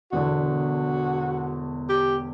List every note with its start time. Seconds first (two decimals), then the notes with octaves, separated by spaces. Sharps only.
0.12 E1 E2 D3 F#4
1.89 G4